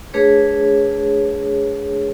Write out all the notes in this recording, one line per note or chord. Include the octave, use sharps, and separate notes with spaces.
A3 D4 G#4 B4 C#5